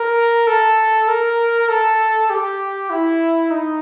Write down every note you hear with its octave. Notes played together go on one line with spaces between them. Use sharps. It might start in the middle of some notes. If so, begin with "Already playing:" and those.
Already playing: A#4
A4
A#4
A4
G4
E4
D#4